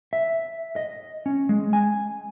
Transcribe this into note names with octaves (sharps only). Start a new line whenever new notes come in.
E5
D#5
C#4
G#3
G#5